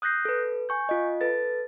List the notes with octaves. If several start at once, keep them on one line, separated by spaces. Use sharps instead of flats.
D#6 F#6 G6 A#6 C7
A4 B4
G#5 C#6 G6
F4 D#5
A4 B4 A6